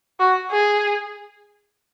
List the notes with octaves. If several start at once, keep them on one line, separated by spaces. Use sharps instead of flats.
F#4
G#4